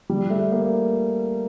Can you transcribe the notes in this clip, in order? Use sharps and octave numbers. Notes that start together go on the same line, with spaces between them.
G3
A3
A#3